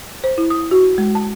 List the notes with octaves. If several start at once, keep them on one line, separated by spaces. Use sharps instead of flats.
C5
E4
D#6
F#4
G#3
A5